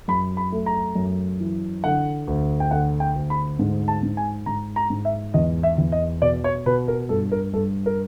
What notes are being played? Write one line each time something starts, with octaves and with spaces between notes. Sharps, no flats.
F#2 B5
B5
A3
A#5
F#2
E3
D3 F#5
D2
G5
D3 F#5
G5
D2
B5
G#2
A5
G#2
G#5
G#2 A#5
A#5
G#2
E5
E2 D#5
E5
E2
D#5
B2 D5
C#5
B2 B4
A#4
G2 A4
A#4
G2 A4
A#4